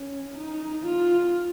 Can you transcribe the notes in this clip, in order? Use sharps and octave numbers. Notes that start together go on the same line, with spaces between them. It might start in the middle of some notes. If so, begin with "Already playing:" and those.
Already playing: C#4
D#4
F4